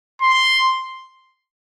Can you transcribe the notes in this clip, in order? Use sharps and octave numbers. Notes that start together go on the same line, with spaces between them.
C6